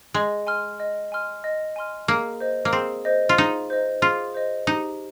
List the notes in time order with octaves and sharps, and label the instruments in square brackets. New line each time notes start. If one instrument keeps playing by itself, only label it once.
[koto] G#3 [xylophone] D#5
[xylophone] G#5 C6 F6
D#5
G#5 C6 F6
D#5
G#5 C6 F6
[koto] A#3 [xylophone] G#4
[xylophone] C5 D#5
[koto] A#3
[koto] C4 [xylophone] G#4
[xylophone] C5 D#5
[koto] F4
[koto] D#4 [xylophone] G#4
[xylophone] C5 D#5
[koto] F4 [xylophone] G#4
[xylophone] C5 D#5
[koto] D#4 [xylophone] G4